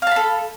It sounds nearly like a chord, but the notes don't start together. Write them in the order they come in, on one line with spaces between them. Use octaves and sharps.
F5 A5 B5 A4